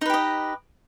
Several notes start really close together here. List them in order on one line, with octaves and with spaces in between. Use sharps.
D#4 B4 G4 D#5